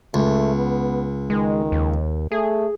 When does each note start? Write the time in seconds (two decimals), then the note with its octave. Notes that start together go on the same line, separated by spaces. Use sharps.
0.14 C#2 A3
0.56 B3
1.30 D#3 G#3
1.72 D#2
2.32 A3 G#4